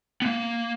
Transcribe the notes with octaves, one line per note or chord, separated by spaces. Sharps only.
B3
A#3